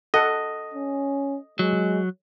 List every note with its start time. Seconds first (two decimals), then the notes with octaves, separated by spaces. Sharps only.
0.14 A4 D#5 F#5
0.74 C#4
1.59 F#3 G#3